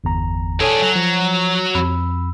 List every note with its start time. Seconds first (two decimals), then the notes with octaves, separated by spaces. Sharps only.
0.04 G1 E2 A#5
0.61 D4 G#4 A4 C#5 G#5
0.82 F#3
0.95 F3
1.75 F2 B5 E6